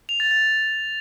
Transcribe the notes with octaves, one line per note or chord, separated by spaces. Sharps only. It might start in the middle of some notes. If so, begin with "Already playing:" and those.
F7
A6
A6